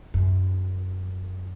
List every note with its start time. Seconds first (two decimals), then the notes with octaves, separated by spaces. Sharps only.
0.14 F#2